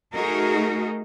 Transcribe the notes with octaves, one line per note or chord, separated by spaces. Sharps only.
A3 D#4 F#4 G#4 A#4